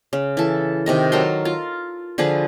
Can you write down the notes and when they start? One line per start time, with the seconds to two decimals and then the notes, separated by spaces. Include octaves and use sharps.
0.13 C#3
0.37 E3 A4
0.86 C3 D#3 D#5
1.12 F#3 A4 A#4 C6
1.45 F4
2.18 D3 F3 G#4 B4